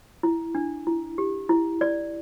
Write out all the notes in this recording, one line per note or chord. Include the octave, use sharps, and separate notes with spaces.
E4
D4
E4
G4
E4
D5